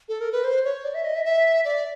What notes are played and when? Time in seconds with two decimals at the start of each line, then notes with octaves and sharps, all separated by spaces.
0.09 A4
0.21 A#4
0.32 B4
0.44 C5
0.64 C#5
0.84 D5
0.94 E5
1.05 D#5
1.15 E5
1.25 E5
1.65 D5